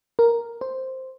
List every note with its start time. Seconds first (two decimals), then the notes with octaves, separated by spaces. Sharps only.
0.19 A#4
0.61 C5